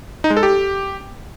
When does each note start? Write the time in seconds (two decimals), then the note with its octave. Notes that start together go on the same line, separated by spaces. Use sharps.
0.24 D#4
0.30 G#3
0.37 A4
0.43 G4